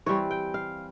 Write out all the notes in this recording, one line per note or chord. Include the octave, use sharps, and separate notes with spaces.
E3 G3 C4 C#5
G5
F5